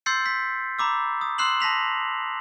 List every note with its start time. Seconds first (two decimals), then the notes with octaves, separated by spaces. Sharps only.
0.06 C6 E6 G6 A6 C7 C#7
0.26 B6
0.79 A#5 B5 D6 E6
1.21 D#6
1.38 C6 E6 F#6 C7 E7 F#7
1.60 A5 A#6 B6 F7